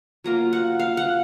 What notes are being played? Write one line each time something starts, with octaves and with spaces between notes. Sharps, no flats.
F#3 A#3 F4 A#5
F#5
F5
F#5